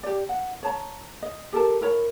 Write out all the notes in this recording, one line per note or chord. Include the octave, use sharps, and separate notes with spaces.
G4 D5
F#5
C#5 A5 A#5
D#5
G4 A4 A#4 A5
E4 A#4 C#5 B5